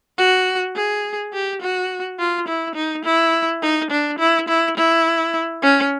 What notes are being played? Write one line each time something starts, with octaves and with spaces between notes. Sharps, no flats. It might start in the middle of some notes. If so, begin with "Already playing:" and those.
F#4
G#4
G4
F#4
F4
E4
D#4
E4
D#4
D4
E4
E4
E4
C#4